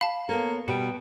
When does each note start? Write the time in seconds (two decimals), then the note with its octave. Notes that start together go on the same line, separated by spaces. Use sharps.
0.01 F5 A5 B5
0.29 A#3 B3 A4 C#5
0.68 B2 G3 F#4 B4 G5